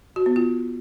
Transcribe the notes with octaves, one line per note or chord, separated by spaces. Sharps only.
F#4
B3
F4